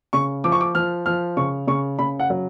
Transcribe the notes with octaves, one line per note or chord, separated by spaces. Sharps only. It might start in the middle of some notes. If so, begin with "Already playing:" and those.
C#3 C#6
F3 D6
C#6
D6
F3 F6
F3 F6
C#3 C#6
C#3 C#6
C#3 B5
F#5
F#3